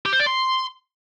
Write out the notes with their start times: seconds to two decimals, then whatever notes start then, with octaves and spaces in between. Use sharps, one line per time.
0.06 G4
0.13 C5
0.19 D5
0.26 C6